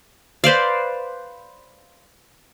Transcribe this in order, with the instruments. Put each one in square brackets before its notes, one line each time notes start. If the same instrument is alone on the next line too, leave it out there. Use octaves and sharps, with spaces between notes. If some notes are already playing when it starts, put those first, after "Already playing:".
[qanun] B4 C5 D5 F5